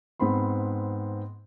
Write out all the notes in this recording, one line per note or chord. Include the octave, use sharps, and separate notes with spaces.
G#2 B3 C4 B5 C6